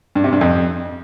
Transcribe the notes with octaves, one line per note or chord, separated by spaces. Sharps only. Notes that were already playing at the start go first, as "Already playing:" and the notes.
G2
C3
G2
F2